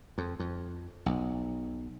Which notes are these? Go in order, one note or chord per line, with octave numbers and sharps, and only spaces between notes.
F2
F2
B1